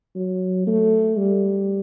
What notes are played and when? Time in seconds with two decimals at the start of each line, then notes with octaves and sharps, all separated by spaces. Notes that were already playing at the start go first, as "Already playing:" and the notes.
0.16 F#3
0.67 A3
1.17 G3